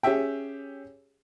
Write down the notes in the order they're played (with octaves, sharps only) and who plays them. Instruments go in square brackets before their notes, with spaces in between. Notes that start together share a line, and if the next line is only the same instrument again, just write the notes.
[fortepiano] C#4 G4 G#4 E5 G5